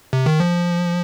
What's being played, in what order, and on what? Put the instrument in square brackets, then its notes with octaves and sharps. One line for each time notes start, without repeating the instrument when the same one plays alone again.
[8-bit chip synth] C3
D#3
F3